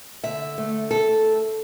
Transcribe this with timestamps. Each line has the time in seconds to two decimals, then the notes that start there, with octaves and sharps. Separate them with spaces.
0.24 D3 E5
0.58 A3
0.91 A4